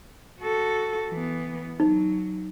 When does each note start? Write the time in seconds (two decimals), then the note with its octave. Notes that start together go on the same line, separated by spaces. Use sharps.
0.41 F#4 A4
1.09 E3 B3
1.80 F#3 D#4